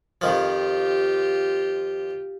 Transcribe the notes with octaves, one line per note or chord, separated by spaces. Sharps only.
F2 D#3 F3 F4 G4